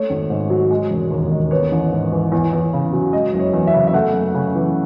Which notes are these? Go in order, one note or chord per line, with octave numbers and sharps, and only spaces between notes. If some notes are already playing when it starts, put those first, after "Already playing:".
Already playing: A3 C#5
G#1
G#2
F#3
G#3
E1
D#2
D#3
B3 C#5
A1
G#2
E3
E2
E2
C#3
F#3
G#3 D#5
F#1
C#5
E2
E5
C#3
E5
A3 F#5
F#2
C#3
E3